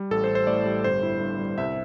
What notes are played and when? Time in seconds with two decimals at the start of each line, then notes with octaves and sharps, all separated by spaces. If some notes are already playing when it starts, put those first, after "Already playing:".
Already playing: G3
0.11 A1 A4
0.24 C5
0.29 A1
0.35 C5
0.47 A2 D5
0.65 G3
0.84 G1 C5
1.03 E4
1.21 G2
1.39 G3
1.58 C2 E5